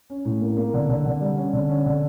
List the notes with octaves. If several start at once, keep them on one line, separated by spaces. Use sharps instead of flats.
C#4
A2
A#3
A#3
D3
D3
D3
G3
C#4
D3
C#4
D3